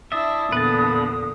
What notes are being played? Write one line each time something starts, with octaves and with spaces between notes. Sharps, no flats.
D4 E4 E5 A5 D#6
E2 A#2 D3 B3 B4 A5